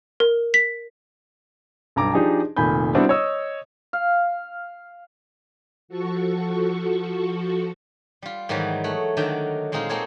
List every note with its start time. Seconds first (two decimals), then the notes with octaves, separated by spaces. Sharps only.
0.20 A#4
0.54 B6
1.96 B1 G2 A#5 D6
2.14 F3 D4 D#4 G4 G#4
2.57 F1 A#2 D#3 G#5 B5 G6
2.95 G3 B3 C4 D4 E4 F#4
3.09 C#5 D#5 D#6 E6
3.93 F5
5.88 F3 F#4 A4 C#6
8.22 G3 F4
8.49 G#2 D#3 E3 F#3 G3
8.84 A3 C#5 F#5
9.17 D3 D#3 F#3 D5 E5 G5
9.72 A#2 G#3 C4 D#4 F4
9.89 A#3 C4 G#4 A4 C#5